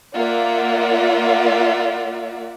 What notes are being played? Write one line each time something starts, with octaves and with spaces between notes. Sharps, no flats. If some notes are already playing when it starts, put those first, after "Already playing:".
A#3 F4 D5 E5 F#5